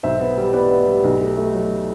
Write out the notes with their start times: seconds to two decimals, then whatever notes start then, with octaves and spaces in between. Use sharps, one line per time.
0.03 B1 C5 E5
0.20 B3
0.37 G3
0.53 B3 B4 D5
0.71 B3
0.87 G3
1.04 B1
1.21 A3
1.37 A3
1.54 F#3